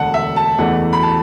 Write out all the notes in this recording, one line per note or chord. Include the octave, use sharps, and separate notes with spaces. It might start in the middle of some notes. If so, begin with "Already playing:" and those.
Already playing: E1 D2 D3 F#5 A5
E5
A5
F#1 E2 E3 A3 F#5
B5
A5